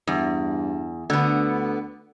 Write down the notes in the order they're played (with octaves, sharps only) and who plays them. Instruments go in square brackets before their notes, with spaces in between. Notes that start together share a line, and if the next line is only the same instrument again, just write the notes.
[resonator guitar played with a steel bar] E2 [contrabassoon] G2
[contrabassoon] D2 [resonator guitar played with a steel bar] D3 B3